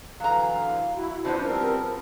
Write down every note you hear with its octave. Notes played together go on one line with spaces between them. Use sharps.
D3 E3 F#3 F5 A#5
E4 F#4
C#3 F3 B3 D4 E4 C5 A5
G3 C4 A#4